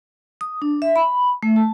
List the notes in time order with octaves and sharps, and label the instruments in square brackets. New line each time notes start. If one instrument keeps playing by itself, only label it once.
[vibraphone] D#6
D4
E5
B5
A3
A5